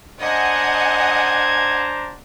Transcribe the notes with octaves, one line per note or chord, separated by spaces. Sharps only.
D4 C5 D#5 F#5 G#5 A#5 G#6